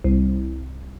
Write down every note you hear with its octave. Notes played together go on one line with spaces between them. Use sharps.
C2